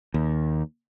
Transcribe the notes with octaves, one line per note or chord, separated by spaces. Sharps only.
D#2